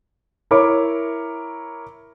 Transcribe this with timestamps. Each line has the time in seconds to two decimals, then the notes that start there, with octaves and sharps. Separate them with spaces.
0.51 E4 A#4 C#5 B5 D6